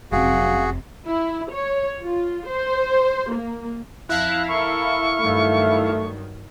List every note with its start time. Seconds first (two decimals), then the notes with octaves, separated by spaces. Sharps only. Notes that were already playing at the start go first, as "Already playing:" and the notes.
0.12 F1 F#2 C3 F#4 G#4 F5
1.05 E4
1.52 C#5
2.02 F4
2.48 C5
3.33 A#3
4.09 F2 E4 E5 F5 A5 F#6 A#6
4.49 A4 A#4 C#6
5.20 G2 D#3 F#3 A3